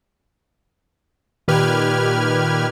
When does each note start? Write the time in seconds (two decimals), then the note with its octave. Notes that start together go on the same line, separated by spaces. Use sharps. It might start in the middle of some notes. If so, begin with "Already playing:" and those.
1.48 A#2 D#3 G4 B4 F6 G#6